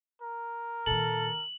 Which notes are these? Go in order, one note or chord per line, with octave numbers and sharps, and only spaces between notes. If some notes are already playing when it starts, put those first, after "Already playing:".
A#4
A#2 D#3 A4 F#7